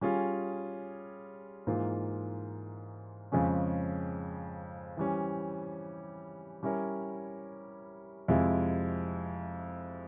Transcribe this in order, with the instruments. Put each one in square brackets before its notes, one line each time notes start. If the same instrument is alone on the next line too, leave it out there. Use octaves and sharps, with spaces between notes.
[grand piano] G3 C#4 F4 G#4
G#2 E3 A#3 F4
F2 C#3 F3 G#3 C#4
E3 G3 C#4
G3 C#4 E4 A#4 C#5
F2 C3 F3 G#3 E4